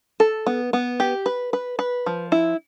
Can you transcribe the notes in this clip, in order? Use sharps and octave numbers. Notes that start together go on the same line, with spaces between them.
A4
B3
B3
G4
B4
B4
B4
F3
E4